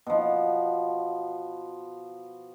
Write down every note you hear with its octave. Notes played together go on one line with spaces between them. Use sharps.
B2 F3